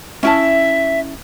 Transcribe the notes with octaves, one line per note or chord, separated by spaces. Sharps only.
C#4 E4 E5 A5